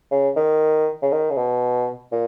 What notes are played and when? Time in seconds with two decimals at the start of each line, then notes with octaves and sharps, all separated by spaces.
0.12 C#3
0.36 D#3
1.02 C#3
1.12 D#3
1.30 C#3
1.37 B2
2.12 A#2